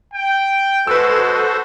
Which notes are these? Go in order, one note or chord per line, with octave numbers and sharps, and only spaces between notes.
G5
G#3 F#4 A4 B4 C5 E6